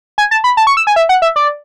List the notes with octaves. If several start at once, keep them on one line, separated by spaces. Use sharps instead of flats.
G#5
A5
B5
A5
C#6
E6
G#5
E5
F#5
E5
D5